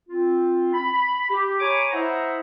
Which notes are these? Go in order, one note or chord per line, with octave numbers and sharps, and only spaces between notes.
C4 F4
B5
G4
C#5 G#5 A#5 B5 C#6 D6
E4 C5 D#5 E5 F#5 A#5